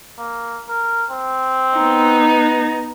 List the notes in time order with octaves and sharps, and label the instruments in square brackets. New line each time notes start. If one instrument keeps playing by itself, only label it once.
[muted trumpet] A#3
A#4
C4
[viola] B3 D#4